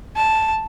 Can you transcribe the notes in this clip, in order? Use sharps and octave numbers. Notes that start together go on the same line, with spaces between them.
A5